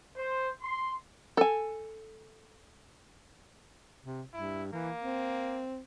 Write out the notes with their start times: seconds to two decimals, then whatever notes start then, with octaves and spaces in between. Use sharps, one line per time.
0.17 C5
0.62 C6
1.37 A4 G#5
4.03 C3
4.33 G2 E4
4.73 E3 A#3
5.02 C4